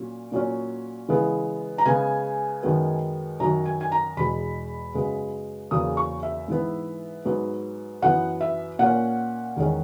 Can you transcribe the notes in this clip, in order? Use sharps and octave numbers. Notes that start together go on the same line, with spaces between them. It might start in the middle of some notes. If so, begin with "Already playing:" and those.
Already playing: A#2 F#3 C#4
A#2 F#3 C#4
C#3 E3 G#3 B3
A#5
C#3 G#3 B3 G#5
F#2 D#3 G#3 B3
F#2 D#3 F#3 A#5
G#5
G#5
A#5
E2 B2 G#3 B5
F#2 C#3 G#3 B3
E2 C#3 F#3 A#3 D#6
C#6
E5
G#2 E3 B3
G#2 F#3 B3
F#2 E3 B3 F#5
E5
A#2 A#3 C#4 F#5
E2 D#3 G#3 C#4